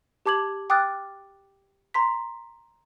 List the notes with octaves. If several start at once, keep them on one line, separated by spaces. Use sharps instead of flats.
G4 A5 D6 G#6 F#7
G5 D6 D#6 F6 F#6 A6
A#5 C6 B6